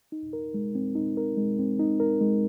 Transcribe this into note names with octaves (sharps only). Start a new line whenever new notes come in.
D#4
A#4
G#3
C4
D#4
A#4
G#3
C4
D#4
A#4
G#3